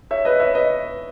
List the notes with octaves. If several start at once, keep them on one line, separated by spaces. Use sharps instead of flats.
C#5 E5
B4 D#5
C#5 E5
B4 D#5